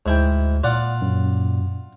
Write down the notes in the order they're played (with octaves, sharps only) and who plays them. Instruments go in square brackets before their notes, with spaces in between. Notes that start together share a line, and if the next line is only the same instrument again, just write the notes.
[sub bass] D2 [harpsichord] G#2 E4 G5
[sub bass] A#2 [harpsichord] F4 D5 F#5
[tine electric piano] F#2